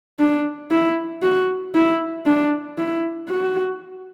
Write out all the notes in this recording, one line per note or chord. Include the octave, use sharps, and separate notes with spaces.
D4
E4
F#4
E4
D4
E4
F#4